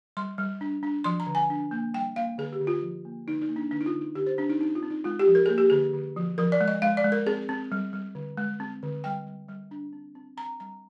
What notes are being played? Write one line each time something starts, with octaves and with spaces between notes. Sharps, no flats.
G3 C6
G3
D4
D4
F3 C6
A#5
D3
G#5
D4
A#3
G3 G5
A#3 F5
D3 G#4
G4
D3
F4
F3
A#3
D3 D#4
D#4
A#3
D4
D3 D4
D#4
F4
D3
D#4
D3 G4
C5
C4 D4
D#4
C4 D#4
F4
C4
D#4
G#3 F4
G4
F3
A#4
A#3 G#4
G4
D3 G#4
D3
F3
F3 A#4
D5
G#3
D#5
G#3 F5
D5
G#3
A#4
C4 G#4
C4
G3
G3
D3
G#3
C4
D3
G3 G5
G3
G3
D4
C4
C4
C4 A#5
G3 A#5